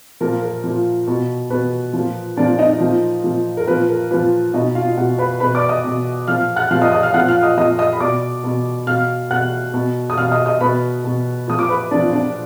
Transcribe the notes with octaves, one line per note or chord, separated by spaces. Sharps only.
A#2 F3 A#4
A#4
A#2 F3
B2
B2 B4
A#2 F3
A#2 F3 D4 D5
D#4 D#5
A#2 F3
A#2 F3
A#4
A#2 F3 B4
A#4
A#2 F3 B4
B2 D#4 D#5
F4 F5
B2 F#4 F#5
B4 B5
B2 B4 B5
D5 D6
D#5 D#6
B2
A#2 F3 F5 F6
F#5 F#6
A#2 F3 F5 F6
D#5 D#6
D#5 D#6
F5 F6
A#2 F3 F#5 F#6
F5 F6
D#5 D#6
A#2 F3 D#5 D#6
D#5 D#6
B5
B2 D5 D6
B2
B2 F5 F6
B2 F#5 F#6
B2
D#6
B2 F5 F6
D#5 D#6
D#5 D#6
B2 B4 B5
B2
A#2 F3 D#6
D6
B4 B5
A#2 F3 D4 D5
D4 D5